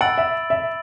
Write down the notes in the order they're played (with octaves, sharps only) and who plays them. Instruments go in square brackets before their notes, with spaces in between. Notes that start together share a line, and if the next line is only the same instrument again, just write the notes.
[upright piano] F#5 [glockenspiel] B5 E6 A6 D7 F#7
[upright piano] E5
E5